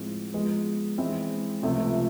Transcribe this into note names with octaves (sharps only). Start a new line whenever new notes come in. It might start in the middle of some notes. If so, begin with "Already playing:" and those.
Already playing: A2 F3 G#3 C4 F4
F3 G#3 B3
E3 G#3 C4 E4
C#2 C3 F3 A3